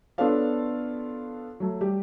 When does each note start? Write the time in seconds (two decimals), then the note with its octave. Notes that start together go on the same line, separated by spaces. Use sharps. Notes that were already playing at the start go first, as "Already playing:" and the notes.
0.18 B3 D4 F4 A4 C#5 F5
1.60 F#3 A3
1.81 G3 G4